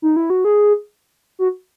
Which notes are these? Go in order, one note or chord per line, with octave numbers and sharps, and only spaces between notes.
D#4
E4
F#4
G#4
F#4